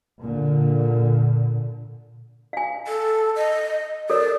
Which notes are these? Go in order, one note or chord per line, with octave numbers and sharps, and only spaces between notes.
A#2 D3
F5 G#5
A4
D#5
A4 A#4 C#5 D5